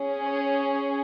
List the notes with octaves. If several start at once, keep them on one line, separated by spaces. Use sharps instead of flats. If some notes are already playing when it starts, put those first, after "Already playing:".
Already playing: C#4 G#4
C#5